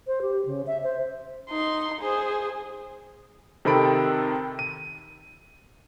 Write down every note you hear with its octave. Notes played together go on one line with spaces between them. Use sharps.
C5
G4
C#3
E5
C5
D#4 C6
G#4 C5
C3 D#3 C4 A4 B5 D7
D#7